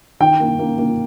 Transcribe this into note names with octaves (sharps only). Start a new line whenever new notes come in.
D#3 G5
A#3
A#3
A#3